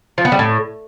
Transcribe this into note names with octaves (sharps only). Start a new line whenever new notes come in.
F3
B3
G3
A2